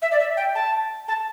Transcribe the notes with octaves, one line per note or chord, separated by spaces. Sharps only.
E5
D5
E5
G5
A5
A5